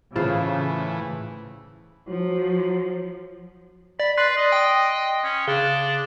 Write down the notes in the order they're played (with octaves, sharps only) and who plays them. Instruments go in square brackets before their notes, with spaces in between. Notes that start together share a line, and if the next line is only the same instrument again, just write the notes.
[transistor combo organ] A2 E3 [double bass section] C#3 [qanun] F4 G#4 C5
[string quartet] F3 [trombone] F#3
[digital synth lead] D5 [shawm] B5
[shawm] B4 [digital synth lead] D5 [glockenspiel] C6 F#6 C7
[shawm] D#5
[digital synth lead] G5 [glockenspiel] D#6
[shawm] C#4
[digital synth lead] C#3 [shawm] D4 [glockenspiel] G7